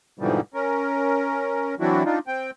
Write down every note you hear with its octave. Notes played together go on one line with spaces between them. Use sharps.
G#2 B2 D3 E3 F3 G3
C#4 A#4
E3 F#3 C4 D4 E4 F#4
D4 D#4 F4
C4 G5